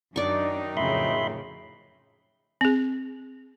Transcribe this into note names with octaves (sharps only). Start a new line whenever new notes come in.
F#2 D#3 F#3 D4 D#4 D5 C#6
F2 A2 C#3 E5 B5 C6
C4 G#4